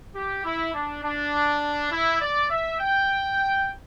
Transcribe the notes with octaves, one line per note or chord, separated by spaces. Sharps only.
G4
E4
D4
D4
E4
D5
E5
G5